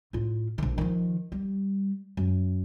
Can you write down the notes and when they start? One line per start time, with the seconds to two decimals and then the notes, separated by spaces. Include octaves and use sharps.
0.13 A2 F4
0.58 A#1 D3
0.78 D#3 F3
1.32 G3
2.17 F#2